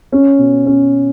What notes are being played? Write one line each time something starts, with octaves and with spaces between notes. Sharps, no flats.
C#4
B2
C#4